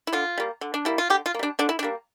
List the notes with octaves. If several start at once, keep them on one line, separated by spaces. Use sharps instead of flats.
E4
D3 F4
G3 A#3
D3
D4
G3 A#3 E4
F4
D3 G4
F4
A#3
G3 D4
D3 D4
E4
D4
G3 A#3